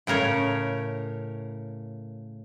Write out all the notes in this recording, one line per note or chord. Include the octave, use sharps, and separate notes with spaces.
A2 C#3 A#4 C#5